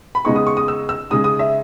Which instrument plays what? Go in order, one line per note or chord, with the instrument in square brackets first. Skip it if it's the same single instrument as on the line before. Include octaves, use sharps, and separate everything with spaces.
[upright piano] B5
C#3 G#3 B3 D#4 C#6
D#6
C#6
D#6
E6
E6
C#3 G#3 D#4 D#6
D#6
E5